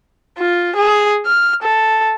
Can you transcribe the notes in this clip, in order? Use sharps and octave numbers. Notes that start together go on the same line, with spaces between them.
F4
G#4
F6
A4